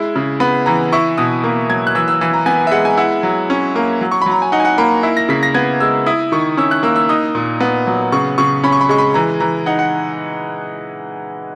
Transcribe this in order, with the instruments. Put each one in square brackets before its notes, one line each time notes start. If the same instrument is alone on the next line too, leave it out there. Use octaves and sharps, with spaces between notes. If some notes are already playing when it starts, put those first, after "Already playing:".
Already playing: [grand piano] G#3 E4
C#3
B3 B5
E3 A#5
E4 C#6
B2 D#6
A#3
F#3 G#6
F#6
E3 E6
E6
E3 E6
A#5
B3 G#5
E5
G#3 F#5
G#5
E4 F#5
F#3
C#4
A#3
F#3
C#6
F#3 B5
A#5
G#5
D#4 F#5
G#5
F#5
A#3 B5
E4
A#6
C#3 B6
A#6
B3 G#6
G#3 E6
E4 D#6
D#3 C#6
C#4 E6
F#6
A#3 E6
E6
D#4 D#6
A#2
B3
F#3
C#3 C#6
C#3 C#6
C#4 B5
C#6
B5
G#3 C#6
B5
E3 A#5
E3 A#5
D#4 F#5
F#5